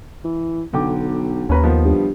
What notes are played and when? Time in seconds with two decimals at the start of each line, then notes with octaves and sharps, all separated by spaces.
0.24 E3
0.73 B1 D3 G5 D6
1.49 D#2 C#4 B4 A#5
1.62 D#3 F3 B3
1.85 G2